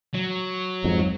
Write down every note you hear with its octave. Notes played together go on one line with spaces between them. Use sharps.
F#3
F2 G#2